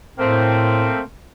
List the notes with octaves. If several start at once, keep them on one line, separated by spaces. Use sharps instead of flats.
A2 A3 A#3 C4